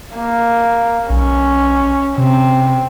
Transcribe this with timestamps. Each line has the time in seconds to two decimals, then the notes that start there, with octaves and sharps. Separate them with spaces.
0.16 A#3
1.10 B1 C#4
2.18 C3 C4